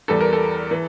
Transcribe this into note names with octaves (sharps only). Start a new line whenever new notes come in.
E2 E3 G3 A4
A#4
A4
E3